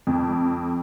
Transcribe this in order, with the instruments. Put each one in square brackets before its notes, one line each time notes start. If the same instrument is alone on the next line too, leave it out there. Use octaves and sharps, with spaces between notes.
[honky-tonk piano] F2